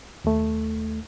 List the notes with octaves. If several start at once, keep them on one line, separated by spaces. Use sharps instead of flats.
D#2 A3